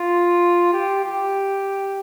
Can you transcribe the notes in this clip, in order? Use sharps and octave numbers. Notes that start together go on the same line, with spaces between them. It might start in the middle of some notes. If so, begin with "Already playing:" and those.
Already playing: F4
G4
G4